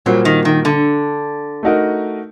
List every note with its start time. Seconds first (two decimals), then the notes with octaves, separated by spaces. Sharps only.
0.06 A#2 F#3 G3 A#3 F#4 C5
0.25 D#3
0.45 D#3
0.65 D3
1.63 A3 D#4 F#4 A#4 D#5